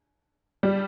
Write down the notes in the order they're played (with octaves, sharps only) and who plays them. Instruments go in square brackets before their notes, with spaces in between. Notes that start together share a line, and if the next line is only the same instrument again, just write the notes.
[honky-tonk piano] G3